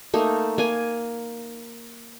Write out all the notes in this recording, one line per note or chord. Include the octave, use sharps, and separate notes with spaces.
A3 A#3 D#4
A#3 G#5